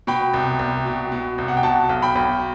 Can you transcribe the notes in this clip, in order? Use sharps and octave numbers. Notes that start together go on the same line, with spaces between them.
B2 G5 B5
C2
C2
B2
B2
C2
F#5
G5
B2 F#5 A5
B1
G5 B5
B1